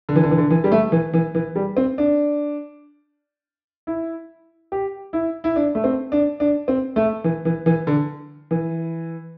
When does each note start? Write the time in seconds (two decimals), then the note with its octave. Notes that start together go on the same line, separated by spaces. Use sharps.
0.09 D3
0.16 E3
0.23 D3
0.31 E3
0.38 D3
0.50 E3
0.64 G3
0.72 A3
0.92 E3
1.13 E3
1.35 E3
1.55 G3
1.77 C4
1.98 D4
3.87 E4
4.72 G4
5.13 E4
5.44 E4
5.56 D4
5.75 A3
5.84 C4
6.12 D4
6.40 D4
6.68 C4
6.96 A3
7.24 E3
7.45 E3
7.66 E3
7.87 D3
8.51 E3